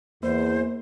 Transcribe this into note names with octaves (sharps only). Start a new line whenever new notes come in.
E2 A#3 C5